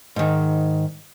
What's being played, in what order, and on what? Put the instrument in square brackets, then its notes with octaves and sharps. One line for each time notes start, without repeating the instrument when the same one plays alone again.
[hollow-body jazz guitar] G#2 D#3